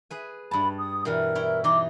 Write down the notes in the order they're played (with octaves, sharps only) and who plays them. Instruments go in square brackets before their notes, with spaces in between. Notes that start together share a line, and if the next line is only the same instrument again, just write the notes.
[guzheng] G#4 B4 G#5
[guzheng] G2 A5 [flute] B5
[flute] D#6
[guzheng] B2 E3 G3 [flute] A#4
[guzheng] E4 C#5 G5
[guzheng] E3 D#4 [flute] D6